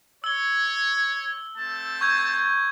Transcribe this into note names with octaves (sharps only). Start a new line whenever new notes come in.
C#5 E6 G7
A3 C4 A5
C#6 G6 G#6